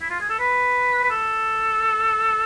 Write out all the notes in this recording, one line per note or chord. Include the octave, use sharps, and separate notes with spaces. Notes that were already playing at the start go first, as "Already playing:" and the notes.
E4
F4
G#4
A4
B4
B4
A4